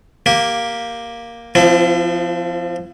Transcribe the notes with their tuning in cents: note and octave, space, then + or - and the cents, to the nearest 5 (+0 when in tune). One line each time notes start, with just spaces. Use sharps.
A#3 +0 G4 +0
F3 +0 C4 -30 E4 +40